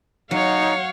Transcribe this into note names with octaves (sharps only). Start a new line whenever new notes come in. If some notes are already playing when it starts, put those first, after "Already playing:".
F#3 D#4 C#5 F5 F#5